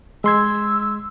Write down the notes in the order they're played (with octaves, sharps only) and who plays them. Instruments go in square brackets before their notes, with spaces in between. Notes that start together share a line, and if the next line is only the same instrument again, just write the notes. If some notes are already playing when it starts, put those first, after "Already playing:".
[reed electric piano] G#3 C6 G#6 [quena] E6